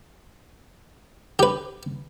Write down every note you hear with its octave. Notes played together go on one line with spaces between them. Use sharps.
G4 B4